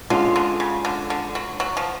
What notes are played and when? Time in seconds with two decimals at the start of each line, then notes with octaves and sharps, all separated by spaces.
0.10 D3 G#3 C#4 F4
0.36 D3
0.60 C#3
0.85 D3
1.10 D3
1.35 F#3
1.60 F#3
1.77 F3